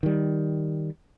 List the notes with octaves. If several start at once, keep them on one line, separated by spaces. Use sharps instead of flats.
D#3 G3